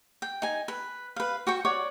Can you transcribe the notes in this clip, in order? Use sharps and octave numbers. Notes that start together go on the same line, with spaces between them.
G5
D#4 G#5
B4
B4 F5
F#4 G5 C#6
C#5 D5 F#5 C#6